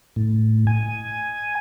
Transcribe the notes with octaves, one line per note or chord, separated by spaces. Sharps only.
A2
G#5